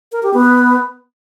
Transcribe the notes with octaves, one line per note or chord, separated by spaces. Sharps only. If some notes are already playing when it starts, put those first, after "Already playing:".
A#4
G4
B3